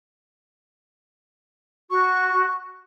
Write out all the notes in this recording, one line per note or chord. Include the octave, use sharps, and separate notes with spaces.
F#4 C#6